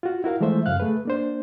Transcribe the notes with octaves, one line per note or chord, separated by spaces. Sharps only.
F4 F#4
E4 F#4 A#4 F5
E3 F3 G#3 A3 C5 E5
F#2 C#3 F5 F#6
A3 G#4 B4
A#3 D4 C5